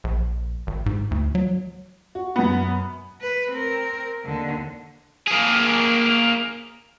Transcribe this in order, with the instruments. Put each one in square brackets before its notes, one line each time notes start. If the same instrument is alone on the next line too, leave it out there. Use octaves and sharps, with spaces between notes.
[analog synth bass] A#1
G#1
G#2
D2
F#3
[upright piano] F#4
[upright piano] F#2 B2 [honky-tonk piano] B3
[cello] B4
C4 A#4
D#2 D3
[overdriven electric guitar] A#3 G#4